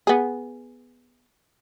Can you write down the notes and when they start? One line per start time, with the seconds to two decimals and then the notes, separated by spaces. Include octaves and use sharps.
0.07 B3 G#4